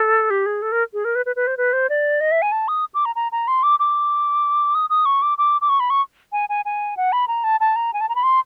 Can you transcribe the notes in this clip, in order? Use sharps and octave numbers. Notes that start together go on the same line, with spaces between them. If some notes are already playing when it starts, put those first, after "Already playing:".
Already playing: A4
G4
G#4
A4
A#4
G#4
A#4
B4
B4
B4
C5
B4
C5
D5
D#5
E5
G#5
A5
D#6
D6
A#5
A#5
A#5
C6
D6
D6
D#6
D#6
C#6
D6
D6
D6
C#6
B5
C#6
G#5
G#5
G#5
F#5
B5
A#5
A5
A5
A#5
G#5
A5
A#5
B5
C6